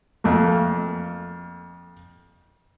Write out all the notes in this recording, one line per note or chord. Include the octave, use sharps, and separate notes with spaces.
F2 A3 A#3